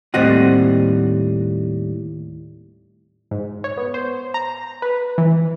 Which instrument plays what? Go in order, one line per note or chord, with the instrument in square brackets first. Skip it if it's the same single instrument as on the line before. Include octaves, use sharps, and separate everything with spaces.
[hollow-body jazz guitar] D#2 A2 G3 C4 D#5 F#5
[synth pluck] G#2
C#5
B3
C5
A#5
B4
E3